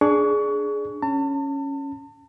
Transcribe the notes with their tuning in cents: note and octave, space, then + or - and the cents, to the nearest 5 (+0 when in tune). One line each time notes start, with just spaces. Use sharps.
D4 +0 G#4 +10 C#6 +30
C#4 +0 A5 +35